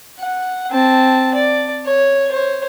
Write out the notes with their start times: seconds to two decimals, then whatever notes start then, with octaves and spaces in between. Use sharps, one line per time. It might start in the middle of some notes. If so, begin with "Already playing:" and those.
0.19 F#5
0.71 C4 A5
1.34 D5
1.86 C#5
2.30 C5 C#5